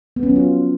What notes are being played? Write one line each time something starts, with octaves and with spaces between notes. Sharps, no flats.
B3
C#4
F#3
F4